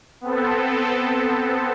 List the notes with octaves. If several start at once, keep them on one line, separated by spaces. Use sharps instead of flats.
B3 C4 A4